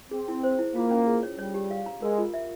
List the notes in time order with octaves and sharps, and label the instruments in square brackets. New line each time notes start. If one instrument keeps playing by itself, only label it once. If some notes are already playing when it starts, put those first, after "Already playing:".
[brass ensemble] C4 [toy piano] G#4
[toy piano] E4
C5
E4
[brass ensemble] A#3 [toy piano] F4
[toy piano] C#4
G#4
C#5
[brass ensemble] G3 [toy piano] C#5
[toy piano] G4
F5
A#5
[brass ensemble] G#3 [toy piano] A#4
[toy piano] F4
E5